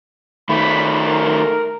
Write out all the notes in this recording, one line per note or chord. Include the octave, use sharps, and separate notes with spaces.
D#3 A3 B5
A#4